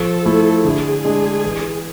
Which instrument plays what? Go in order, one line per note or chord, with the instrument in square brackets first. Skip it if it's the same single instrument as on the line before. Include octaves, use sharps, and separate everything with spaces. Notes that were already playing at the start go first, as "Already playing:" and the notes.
Already playing: [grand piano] F3 [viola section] A4
[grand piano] A3 E4
[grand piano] D3 [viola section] G#4
[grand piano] G#3 D4
E3